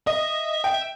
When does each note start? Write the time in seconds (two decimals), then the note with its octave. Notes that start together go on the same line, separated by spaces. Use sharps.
0.07 D#5 E5
0.64 G5